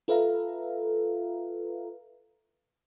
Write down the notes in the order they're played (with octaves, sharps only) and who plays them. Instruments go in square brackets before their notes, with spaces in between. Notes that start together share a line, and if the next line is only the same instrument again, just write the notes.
[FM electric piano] F4 A4 B4 E5 F5 A#5